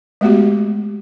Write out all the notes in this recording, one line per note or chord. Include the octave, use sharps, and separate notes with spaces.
G#3 A3 B3 F#4 G4